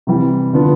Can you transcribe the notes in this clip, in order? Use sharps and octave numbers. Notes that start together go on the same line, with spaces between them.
C3 E3 G3
D3 F3 B3 D4 F4